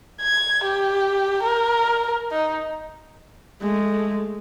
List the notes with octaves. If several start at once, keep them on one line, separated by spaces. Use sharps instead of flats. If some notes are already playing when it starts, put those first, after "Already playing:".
G#6
G4
A#4
D#4
G#3 A3